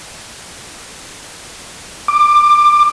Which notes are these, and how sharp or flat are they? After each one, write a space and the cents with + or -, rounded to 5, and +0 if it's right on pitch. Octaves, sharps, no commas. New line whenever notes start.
D6 +20